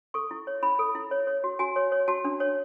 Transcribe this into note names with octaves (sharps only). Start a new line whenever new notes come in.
A4 C#6
E4
C#5
E4 B5
A4
E4
C#5
C#5
F#4
F#4 G#5
C#5
C#5
F#4 A5
D4
C#5